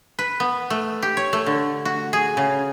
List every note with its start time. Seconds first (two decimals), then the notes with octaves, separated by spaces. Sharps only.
0.19 B4
0.40 B3
0.70 A3
1.02 G4
1.17 C#5
1.33 A3
1.46 D3
1.85 F#4
2.13 G#4
2.37 C#3